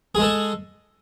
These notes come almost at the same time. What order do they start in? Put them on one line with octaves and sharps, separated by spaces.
G#4 G#3 A4